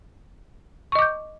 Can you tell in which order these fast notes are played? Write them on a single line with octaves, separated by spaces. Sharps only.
C#6 D#5 D6 G6